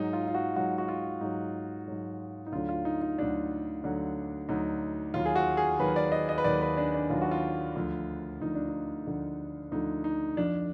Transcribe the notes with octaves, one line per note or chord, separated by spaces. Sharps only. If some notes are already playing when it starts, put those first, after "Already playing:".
Already playing: G#2 F#3 D#4
F4
F4
F#4
G#2 F#3 F#4
F#4
F4
G#2 F#3 D#4
G#2 F#3
D#4
D2 D3 F#3 F4
F4
D#4
D#4
D2 D3 F#3 D4
D2 D3 F#3
D2 D3 F#3 D#4
D#2 D#3 F#3 F4
G#4
F#4
G#4
D#2 D#3 F#3 B4
D5
D#5
D#5
B4
D#2 D#3 F#3 D5
B4
D4
D4
D#2 D#3 F#3 F4
F#4
F4
D2 D3 F3
D2 D3 F3 D#4
D4
D#4
D2 D3 F3
D2 D3 F3 D#4
D#4
F2 F3 D4